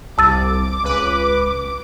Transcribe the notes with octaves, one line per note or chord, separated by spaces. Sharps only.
C2 A5 D6 E6 A6
C#2 B4